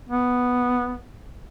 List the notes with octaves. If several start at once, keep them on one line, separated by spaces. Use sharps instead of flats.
B3